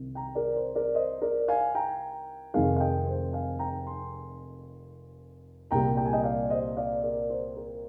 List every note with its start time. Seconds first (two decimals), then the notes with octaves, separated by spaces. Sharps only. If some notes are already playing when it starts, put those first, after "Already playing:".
Already playing: C2 C3 D#3
0.15 G5 A#5
0.35 A#4 D5
0.56 C5
0.75 A#4 D5
0.95 C5 D#5
1.22 A#4 D5
1.48 F5 G#5
1.75 G5 A#5
2.54 F1 F2 C3 D#3 G#3 F5 G#5
2.76 F5
2.80 D#5 G5
3.06 C5
3.33 F5 G#5
3.59 G5 A#5
3.87 G#5 C6
5.71 C2 A#2 G3 G5 A#5
5.97 G5
6.05 G#5
6.13 D#5 G5
6.24 D5 F5
6.50 C5 D#5
6.77 D5 F5
7.04 A#4 D5
7.30 C5
7.57 A#4